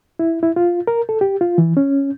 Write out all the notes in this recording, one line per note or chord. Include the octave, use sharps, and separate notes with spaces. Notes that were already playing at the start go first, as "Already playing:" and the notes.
E4
E4
F4
A#4
A4
G4
F4
E3
C#4